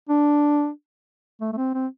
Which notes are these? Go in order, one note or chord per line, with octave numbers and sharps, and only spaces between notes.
D4
A3
A3
C4
C4